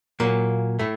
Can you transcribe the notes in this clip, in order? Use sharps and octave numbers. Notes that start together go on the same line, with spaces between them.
A#2 F#3 A#3
A2 A3